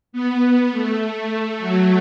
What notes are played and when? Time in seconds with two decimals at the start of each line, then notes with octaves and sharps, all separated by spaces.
0.13 B3
0.72 A3
1.02 A3
1.60 F#3